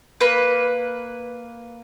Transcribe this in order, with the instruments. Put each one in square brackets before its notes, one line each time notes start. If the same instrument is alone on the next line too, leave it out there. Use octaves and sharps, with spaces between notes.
[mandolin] A#3 B4